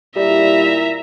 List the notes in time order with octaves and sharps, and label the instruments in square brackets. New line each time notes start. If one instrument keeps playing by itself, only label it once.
[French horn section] A#2 D#4 E4 [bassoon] G3 [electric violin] E5 A#5